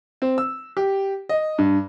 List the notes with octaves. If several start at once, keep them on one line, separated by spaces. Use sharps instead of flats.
C4
E6
G4
D#5
G2